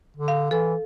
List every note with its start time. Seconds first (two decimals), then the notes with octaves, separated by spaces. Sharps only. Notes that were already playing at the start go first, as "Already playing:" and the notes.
0.17 D3
0.28 F5
0.51 E3 A4